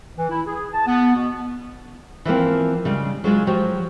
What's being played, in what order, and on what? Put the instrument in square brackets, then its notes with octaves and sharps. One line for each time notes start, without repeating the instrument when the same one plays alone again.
[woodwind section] E3
E4
G#4
A5
B3
B2
[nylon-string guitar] E3 F3 A#3 C4
C#3 G3 G#3
F#3 G#3 F4 F#4
F3 F#3 F#4 G4